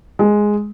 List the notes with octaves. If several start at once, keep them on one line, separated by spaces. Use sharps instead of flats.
G#3